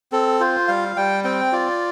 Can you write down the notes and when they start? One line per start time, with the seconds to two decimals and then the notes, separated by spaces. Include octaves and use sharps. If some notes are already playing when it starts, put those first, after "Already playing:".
0.12 C4 A4
0.40 F4 C5
0.68 G3 F5
0.96 G3 G5
1.24 C4 G5
1.53 F4 D5